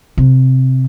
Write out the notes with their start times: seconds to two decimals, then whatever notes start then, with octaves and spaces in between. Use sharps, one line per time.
0.17 C3